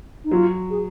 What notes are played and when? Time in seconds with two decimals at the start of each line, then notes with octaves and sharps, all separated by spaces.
0.24 D#4
0.31 F#3 F4
0.70 G#4